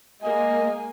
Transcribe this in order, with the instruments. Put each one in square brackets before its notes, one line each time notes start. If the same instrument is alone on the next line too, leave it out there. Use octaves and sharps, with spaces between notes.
[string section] G#3 A#3 [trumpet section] D#5 [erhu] G#5